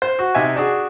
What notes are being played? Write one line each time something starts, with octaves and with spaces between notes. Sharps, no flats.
C5
F#4
C3 D#4 E5 G#5
D4 F#4 G#4